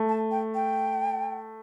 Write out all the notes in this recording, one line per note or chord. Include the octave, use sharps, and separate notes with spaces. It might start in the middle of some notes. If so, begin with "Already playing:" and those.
Already playing: A3
A5
G5
G5